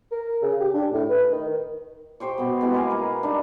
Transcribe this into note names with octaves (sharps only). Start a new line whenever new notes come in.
A#4
C#3
G4
D4
A2
B4
D#3
G4 C5 G5 C#6
B2 B3
G#3 B3 E4 G4
A#3 A#4 F5 G#5
A#4 B4
D4 D#4 G4 B4